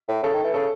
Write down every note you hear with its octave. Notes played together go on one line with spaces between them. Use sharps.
A2
C#3 A4
D#3
E3
C#3 A4